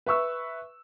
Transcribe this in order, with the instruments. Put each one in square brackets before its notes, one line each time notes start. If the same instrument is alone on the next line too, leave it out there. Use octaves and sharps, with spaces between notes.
[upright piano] B4 E5 C#6 E6